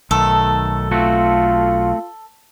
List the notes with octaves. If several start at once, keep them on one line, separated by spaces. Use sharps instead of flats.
B1 D#3 A3 A4
A3 C4 F4 F#4